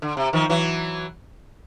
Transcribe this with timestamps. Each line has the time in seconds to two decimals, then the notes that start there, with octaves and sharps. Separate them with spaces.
0.02 D3
0.17 C3
0.33 D#3 F3
0.49 E3 F#3